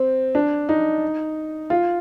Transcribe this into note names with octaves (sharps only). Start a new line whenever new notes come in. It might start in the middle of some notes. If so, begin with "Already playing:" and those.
Already playing: C4
D4
D#4
F4